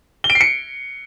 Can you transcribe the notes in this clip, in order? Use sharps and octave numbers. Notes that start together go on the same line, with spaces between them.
G7
D7
C7
C#7